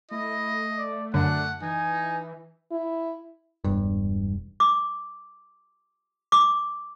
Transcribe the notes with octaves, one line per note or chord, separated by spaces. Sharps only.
A3 E4 D#5
D5
F#2 D3 D4 F#5
E3 D#4 G#5
E4
E1 G2
D6
D6